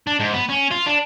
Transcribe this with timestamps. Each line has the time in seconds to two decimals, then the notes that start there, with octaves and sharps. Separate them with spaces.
0.07 D4
0.20 G#2
0.34 B3
0.50 C#4
0.71 F4
0.87 D4